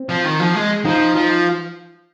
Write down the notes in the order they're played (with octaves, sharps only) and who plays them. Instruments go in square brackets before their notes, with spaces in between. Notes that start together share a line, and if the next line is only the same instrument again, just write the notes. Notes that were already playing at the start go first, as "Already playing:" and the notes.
Already playing: [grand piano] C4
[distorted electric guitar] F3
D#3
F3
G#3
[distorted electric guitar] F3 [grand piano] D#4
[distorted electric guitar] F3